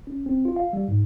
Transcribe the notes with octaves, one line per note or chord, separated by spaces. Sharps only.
C#4
C4
F4
F5
G3
G#2